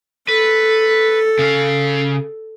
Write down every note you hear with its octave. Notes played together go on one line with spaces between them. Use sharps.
A4 B4
C#3 F5